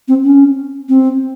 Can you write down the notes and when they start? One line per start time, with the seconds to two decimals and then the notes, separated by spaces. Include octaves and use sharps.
0.08 C4
0.24 C#4
0.89 C4